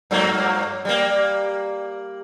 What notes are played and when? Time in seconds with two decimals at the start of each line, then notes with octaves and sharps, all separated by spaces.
0.11 G2 F#3 A#3
0.85 G3 A#3